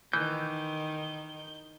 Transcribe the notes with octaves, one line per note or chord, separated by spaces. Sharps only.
D#3 E3 G6